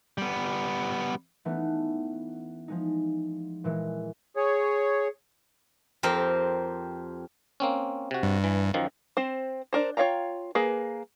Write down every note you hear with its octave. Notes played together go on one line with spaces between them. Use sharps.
G3 B3
E3 A3 B3 C#4 D#4
F3 G#3 D#4
A#2 E3 G#3
G#4 C#5
F2 C4 G4 A#4 C5
A#3 C4 C#4
C3 F#4
G2
E3
F#2 D#3 F3
C4 C5
D4 A#4 C5
F4 C#5 F5 G5 A#5
A#3 G#4 B4